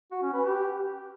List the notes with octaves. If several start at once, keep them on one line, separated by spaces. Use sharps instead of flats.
F#4
C#4
B4
G4